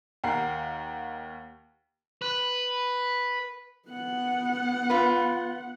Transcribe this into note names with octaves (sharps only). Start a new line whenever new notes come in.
D#2 A#4 F#5 C7
B4
B3 F#5
F4 B4